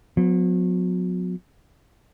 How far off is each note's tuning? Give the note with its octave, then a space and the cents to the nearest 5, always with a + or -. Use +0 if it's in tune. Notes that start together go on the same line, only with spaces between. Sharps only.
F#3 -40 B3 +30